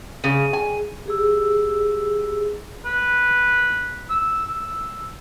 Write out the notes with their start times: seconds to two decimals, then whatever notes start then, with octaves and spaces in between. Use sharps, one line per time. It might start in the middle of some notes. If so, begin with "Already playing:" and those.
0.24 C#3 G#4 D#7
0.53 G#5
1.06 G4 G#4 E6
2.85 B4
4.10 E6
4.53 E6